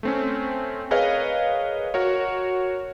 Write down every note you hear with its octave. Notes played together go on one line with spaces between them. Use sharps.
A3 C4 C#4
G#4 A#4 B4 C#5 D#5 F5
F#4 A#4 C#5